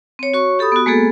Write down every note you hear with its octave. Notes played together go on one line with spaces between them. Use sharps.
C4 C#5
F#4 C#5 C#6
G4 A4 B5 D#6
B3 F#4
G#3 A#3 B3 G#4 A4